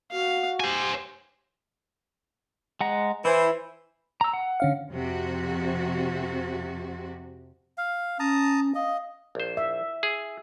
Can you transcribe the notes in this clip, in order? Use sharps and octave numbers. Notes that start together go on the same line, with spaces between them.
F#4 F5
G4 C5 G#5
G#3 F#5 A#5
E3 E4 C5
A#5 E6
F#5
D3 C#4 F5
F2 C3 F#4
F5
C#4 A5 A#5 D#6
D#5 F5
A#1 C5
E5
G#4